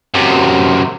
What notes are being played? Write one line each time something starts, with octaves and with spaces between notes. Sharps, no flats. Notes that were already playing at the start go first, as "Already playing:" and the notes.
F#2 C3